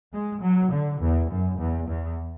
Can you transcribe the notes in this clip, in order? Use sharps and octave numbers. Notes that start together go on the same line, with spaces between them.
G#3
F#3
D3
E2
F#2
E2
E2